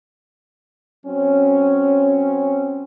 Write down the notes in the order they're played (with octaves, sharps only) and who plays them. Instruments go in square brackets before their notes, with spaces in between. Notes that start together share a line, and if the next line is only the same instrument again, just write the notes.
[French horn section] F#3 C4 C#4